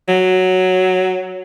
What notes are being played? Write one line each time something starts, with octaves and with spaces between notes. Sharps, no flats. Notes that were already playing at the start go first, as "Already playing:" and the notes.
F#3